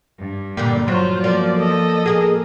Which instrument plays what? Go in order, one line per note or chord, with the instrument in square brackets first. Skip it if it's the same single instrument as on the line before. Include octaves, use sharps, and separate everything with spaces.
[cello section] G2
[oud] A#2 D3 A#3 [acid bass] G3
[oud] F3 [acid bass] F#3 [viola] F4 C5
[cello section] F3 [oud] A#3 B3 [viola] D5
[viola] A4 D#5
[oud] A#3 G4 A#4 [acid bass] G#4